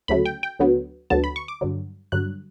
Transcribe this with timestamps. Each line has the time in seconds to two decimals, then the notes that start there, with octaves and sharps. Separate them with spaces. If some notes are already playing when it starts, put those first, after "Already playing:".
0.08 D2 C#3 F#3 A3 B5
0.25 G5
0.43 G5
0.59 D2 D3 F#3 B3
1.10 D2 D3 F#3 B3 A5
1.24 B5
1.36 C#6
1.48 D6
1.61 G2 D3 F#3
2.12 G2 D3 F#3 F#6